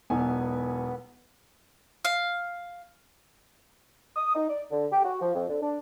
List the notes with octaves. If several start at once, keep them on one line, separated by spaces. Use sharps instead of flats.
E1 B1 B3 G#5
F5
D#6
D#4
D5
D3
G4
F#4
F3
F2
D3
D4